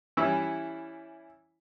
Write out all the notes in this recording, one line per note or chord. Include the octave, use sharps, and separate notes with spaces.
E3 G3 C#4 E4 C#5